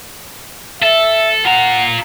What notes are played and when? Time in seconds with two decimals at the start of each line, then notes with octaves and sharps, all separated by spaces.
0.82 A4 E5
1.46 F4 F#5 A#5